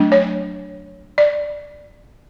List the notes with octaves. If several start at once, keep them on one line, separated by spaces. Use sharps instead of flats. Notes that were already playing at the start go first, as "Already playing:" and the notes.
Already playing: F#3 A3 D4
C#5
D5